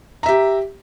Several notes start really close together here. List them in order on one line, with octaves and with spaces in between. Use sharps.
A#5 E5 G4